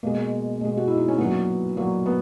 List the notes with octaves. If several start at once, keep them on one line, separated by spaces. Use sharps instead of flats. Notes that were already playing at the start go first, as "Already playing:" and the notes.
B2 G#3 A#3
B2 G#3
F#4
E4
D#4
C#4
A#2 F#3 B3
A#2 F#3 A#3
B3